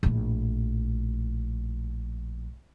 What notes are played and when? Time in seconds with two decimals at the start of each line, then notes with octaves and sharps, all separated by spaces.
0.03 A#1 A2